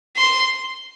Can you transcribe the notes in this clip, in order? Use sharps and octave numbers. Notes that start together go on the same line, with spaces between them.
C6